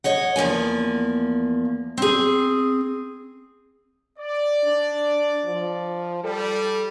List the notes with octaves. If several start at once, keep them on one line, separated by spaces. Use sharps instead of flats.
C#5 D#5 F#5
E2 F3 A#3 G#5
C4 G#4
D5
D4
F3
G3 A4